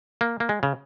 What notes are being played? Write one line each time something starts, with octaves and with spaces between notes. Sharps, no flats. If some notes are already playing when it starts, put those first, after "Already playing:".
A#3
A#3
G#3
C#3